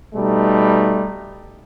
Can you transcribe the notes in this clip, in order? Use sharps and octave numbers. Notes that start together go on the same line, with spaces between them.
B2 G3 A3 D#4